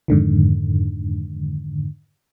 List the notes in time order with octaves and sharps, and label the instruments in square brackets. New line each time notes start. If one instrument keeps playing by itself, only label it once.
[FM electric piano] F2 G#2 D3 D#3